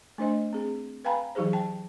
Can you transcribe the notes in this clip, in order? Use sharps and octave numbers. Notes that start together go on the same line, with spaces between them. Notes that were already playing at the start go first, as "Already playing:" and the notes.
A3 D4 C5 D#5
C4 G#4
B4 F5 G5 G#5 A#5 B5
E3 F#3 D#4 G4 G#4 C5
G5 A5